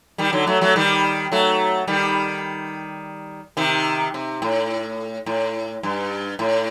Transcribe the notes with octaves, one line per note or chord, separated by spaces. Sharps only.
D#3 G3
D3 F#3
F#3 A3
F#3 A3
D#3 G3
F#3 A3
D#3 G3
C3 D#3
C3
A2
A2
G2
A2